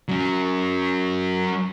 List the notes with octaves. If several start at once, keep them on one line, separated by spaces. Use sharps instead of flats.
F#3 C#4